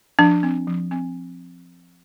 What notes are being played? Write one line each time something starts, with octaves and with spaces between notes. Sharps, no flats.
F3 D4
C4
F3
C4